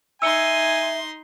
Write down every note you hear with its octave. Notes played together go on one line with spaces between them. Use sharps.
D#4 E5 G#5 C6 E6 C#7 G7